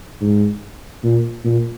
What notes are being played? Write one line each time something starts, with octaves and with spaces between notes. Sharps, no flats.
G#2
A#2
A#2